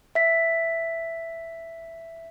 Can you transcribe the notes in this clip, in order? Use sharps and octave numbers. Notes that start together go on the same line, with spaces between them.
E5 B6